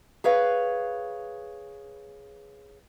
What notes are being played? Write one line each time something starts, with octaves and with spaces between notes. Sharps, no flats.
G#4 B4 C#5 F5